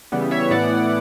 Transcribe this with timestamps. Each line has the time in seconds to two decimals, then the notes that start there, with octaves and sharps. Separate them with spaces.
0.12 C#3 E3 G3 B3
0.31 C#5 E5
0.51 A2 E3 B3 E4 D5 F#5